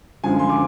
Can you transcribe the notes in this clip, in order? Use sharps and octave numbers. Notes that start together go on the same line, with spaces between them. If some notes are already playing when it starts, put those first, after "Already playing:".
F#2 D3 F3 G#3 G#5
C6
D6